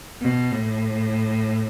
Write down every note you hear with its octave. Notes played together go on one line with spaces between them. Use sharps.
B2
A2